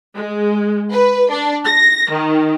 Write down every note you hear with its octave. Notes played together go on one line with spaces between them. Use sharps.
G#3
B4
D4
A#6
D#3